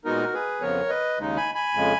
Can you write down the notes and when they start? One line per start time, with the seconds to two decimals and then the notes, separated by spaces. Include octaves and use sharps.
0.05 A#2 G#3 B3 D#4 F#4 A#4
0.33 G#4 B4
0.61 F2 C#3 F3 B3 A#4 C#5
0.89 B4 D#5
1.18 D#2 C#3 G#3 D#4
1.37 G#5 B5
1.55 G#5 B5
1.74 F2 C#3 G#3